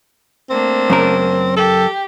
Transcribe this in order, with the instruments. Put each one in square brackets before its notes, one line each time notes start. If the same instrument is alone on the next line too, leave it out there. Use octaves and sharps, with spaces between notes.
[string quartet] A3 A#3 D4 [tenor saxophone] C4
[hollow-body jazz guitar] F#2 C#3 A#4
[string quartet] G4 [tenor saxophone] A4